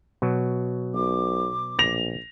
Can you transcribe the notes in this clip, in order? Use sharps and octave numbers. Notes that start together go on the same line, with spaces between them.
B2 F#3
B1 D6
A#1 A#6 F7